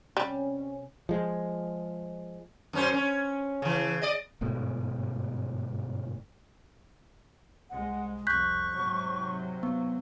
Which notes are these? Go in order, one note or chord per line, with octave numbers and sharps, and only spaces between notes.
C3 G3 C#4
F3 G#3
F#2 C#4 C5
C#4
C#3 E3
D5 D#5
G1 G#2 B2 A3
C2 G#3 F#5
C2 F2 C#6 F#6 G6 B6
G#2 C3 F#3
B3